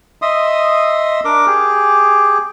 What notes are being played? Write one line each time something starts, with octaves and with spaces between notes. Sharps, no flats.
D#5 E5 C6 D#6
D4 A#4 D6
G4 G#4